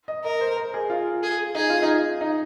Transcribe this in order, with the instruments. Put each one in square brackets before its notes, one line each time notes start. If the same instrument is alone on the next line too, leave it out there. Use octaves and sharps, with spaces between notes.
[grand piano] D#5
[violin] A#4 [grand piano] D#5
[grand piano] C5
A#4
G#4
F4
[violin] G#4
[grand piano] D#4 [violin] G#4
[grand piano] F4
D#4
D#4